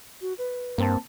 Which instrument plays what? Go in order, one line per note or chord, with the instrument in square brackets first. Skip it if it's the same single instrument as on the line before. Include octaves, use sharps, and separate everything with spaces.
[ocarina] F#4
B4
[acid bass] G2 [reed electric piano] A#3 C4 A5